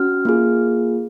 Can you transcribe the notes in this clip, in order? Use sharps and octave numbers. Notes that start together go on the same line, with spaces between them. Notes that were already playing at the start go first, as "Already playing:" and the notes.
Already playing: C#4 F#4 F6
A#3 F4 G#4